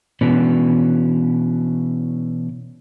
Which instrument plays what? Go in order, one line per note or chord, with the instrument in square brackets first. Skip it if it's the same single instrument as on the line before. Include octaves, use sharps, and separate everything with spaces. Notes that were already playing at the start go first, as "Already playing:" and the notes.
[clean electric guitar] B2 E3 C#4 D4